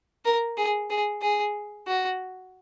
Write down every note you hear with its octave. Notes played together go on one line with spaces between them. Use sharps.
A#4
G#4
G#4
G#4
F#4